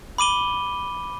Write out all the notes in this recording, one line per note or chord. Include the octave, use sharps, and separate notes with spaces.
B5 D6 D#7 G7